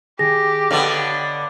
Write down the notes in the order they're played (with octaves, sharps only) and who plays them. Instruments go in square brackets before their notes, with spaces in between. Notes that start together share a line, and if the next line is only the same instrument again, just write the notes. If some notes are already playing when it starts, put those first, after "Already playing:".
[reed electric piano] D#3 G#4 [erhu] G4 [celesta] A#6
[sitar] D3 B3 [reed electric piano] C#5 D#5 F5